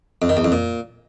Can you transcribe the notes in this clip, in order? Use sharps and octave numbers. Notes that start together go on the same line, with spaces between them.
F2
D#3
E2
F2
A#2